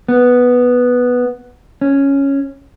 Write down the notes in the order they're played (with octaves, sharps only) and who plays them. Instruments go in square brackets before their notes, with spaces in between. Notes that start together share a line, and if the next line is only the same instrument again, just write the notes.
[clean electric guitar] B3
C#4